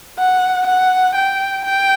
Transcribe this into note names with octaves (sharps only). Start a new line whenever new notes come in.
F#5
F#5
G5
G5